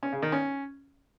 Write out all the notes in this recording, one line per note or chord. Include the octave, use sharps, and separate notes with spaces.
C#4
C#3
D#3
C#4